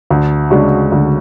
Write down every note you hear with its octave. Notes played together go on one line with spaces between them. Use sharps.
D2
C#3 G#3 D4 F#4
D2